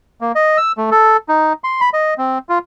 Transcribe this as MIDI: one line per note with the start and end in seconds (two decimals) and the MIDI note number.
0.21 0.32 58
0.35 0.57 75
0.58 0.72 88
0.77 0.90 57
0.91 1.17 69
1.29 1.53 63
1.64 1.81 84
1.81 1.89 83
1.93 2.14 75
2.18 2.38 60
2.49 2.58 65